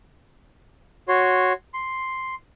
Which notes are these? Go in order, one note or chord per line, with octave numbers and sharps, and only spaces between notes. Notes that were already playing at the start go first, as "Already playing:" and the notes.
F#4 C#5 C6
C6